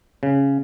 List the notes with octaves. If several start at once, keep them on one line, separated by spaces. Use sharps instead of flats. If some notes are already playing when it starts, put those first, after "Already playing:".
C#3